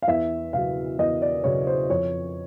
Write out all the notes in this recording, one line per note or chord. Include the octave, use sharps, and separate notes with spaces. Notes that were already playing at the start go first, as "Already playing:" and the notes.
F5
E2 E5
C#3 F#3 F5
E2 D#5
D5
C#3 F#3 C#5
C5
F2 C#5